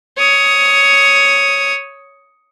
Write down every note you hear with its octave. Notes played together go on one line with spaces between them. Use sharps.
C#5 D#6